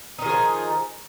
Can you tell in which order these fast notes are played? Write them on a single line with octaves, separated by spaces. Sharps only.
D#4 D#3 G#4 F3